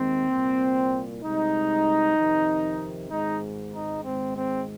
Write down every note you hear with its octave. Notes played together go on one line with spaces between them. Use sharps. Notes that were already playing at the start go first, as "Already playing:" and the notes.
Already playing: D#2 D#3 G#3 C4
C2 A#2 A#3
C2 C3 G#3 D#4
F2 C3 D#3
G#1 G#2 G#3 D#4
D#4
G#1 G#2 G#3 C4
C4